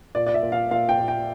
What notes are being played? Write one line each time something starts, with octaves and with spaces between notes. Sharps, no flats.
A#2 D5
D5
E5
A#2
F5
A#2 F5
G5
A#2
G5